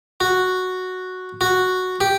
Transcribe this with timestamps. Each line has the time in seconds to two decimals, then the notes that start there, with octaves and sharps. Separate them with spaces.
0.20 F#4
1.41 F#4
2.01 G4